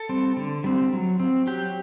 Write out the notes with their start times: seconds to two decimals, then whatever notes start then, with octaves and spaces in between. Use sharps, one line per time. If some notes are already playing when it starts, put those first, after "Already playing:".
Already playing: A4
0.09 G3 C4
0.37 D3
0.64 G3 C4
0.93 F#3
1.20 C4
1.47 F#3 G4